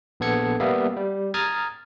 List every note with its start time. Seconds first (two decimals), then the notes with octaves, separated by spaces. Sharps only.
0.20 A#1 B3 A4 G#6 C#7
0.60 G3 A#3 B3 E5 F5
0.96 G3
1.34 A#5 D#6 F6 G#6 A6